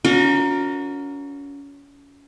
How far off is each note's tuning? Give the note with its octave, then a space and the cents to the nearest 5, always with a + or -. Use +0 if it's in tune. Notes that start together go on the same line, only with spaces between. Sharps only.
C#4 +30 F#4 -40 A#4 +0